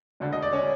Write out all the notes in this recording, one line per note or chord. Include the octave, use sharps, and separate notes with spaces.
E1 D2 D3
D#5
D5
C#4 C#5